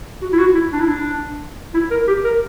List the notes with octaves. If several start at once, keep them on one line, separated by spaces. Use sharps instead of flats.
F#4
E4
F#4
E4
D4
E4
D4
E4
A#4
G4
A#4